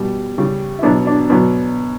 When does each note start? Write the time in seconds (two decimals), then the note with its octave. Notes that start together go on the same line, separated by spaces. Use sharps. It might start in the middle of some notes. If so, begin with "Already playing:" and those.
Already playing: B2 G3
0.38 C#3 G3
0.79 E4
0.83 B2 F#3 D4
1.07 D4
1.30 B2 F#3